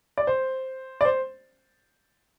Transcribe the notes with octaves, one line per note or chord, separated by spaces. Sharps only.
D5
C5
D5
C5